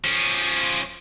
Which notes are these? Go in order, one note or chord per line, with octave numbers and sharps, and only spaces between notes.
F3 C#4